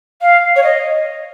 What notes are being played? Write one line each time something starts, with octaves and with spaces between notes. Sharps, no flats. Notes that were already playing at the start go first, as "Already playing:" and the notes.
F5
C#5
D#5